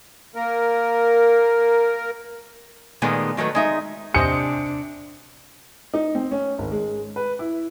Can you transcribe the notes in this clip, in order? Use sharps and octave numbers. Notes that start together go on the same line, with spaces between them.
A#3 A#4
A#2 D#3 G#3 A3 B3
D#3 F#3 A3 B4
G#3 D#4 E5
C3 D4 G4 C5 D#5 G#5 D#6 C#7
D#4
C4
C#4
G#1
G#3
B4
E4